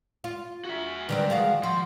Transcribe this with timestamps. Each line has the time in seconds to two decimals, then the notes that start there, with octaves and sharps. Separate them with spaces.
0.24 F4
0.65 F#4 E5
1.09 D3 D#3 G3 C4 B4
1.30 F3 G#3 F#4 F5
1.63 F3 F#4 C6